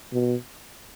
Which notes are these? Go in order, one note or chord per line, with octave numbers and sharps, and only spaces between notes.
B2